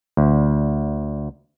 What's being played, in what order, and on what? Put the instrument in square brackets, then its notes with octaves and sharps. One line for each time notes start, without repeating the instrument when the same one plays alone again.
[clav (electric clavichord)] D2